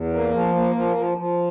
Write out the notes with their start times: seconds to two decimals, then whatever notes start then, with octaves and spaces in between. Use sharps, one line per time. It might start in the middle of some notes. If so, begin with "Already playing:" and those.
Already playing: E2
0.13 A#3
0.34 F3
0.55 A#3
0.75 F3
0.97 F3
1.18 F3